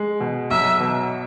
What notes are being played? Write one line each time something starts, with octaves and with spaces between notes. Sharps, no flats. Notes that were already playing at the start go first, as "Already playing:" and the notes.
Already playing: G#3
B2
B1 E5
B2